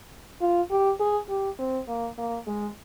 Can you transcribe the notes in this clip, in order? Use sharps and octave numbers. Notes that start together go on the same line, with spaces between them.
F4
G4
G#4
G4
C4
A#3
A#3
G#3